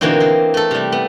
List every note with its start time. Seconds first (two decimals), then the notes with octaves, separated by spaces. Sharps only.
0.01 B2 D3 E3 A#3 C4 D#4
0.20 C4
0.54 A3 A4
0.71 C3 G3
0.92 B3